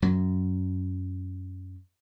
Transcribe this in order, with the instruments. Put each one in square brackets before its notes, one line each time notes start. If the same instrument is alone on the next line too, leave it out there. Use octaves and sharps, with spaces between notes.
[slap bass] F#2 F#3